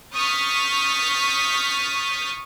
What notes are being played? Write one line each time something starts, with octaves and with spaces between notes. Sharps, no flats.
C#6 D#6 F6 G6 A6 B6